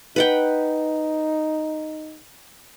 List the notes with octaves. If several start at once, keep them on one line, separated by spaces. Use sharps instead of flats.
D#4 B4 F#5 G5